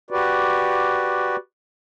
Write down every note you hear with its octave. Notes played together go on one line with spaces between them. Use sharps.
F#4 G4 B4 D5